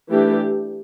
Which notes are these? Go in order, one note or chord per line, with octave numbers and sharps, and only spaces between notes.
E3 A3 D4 G4